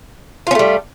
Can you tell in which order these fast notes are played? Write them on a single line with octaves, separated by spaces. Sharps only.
F4 C#4 A3 G3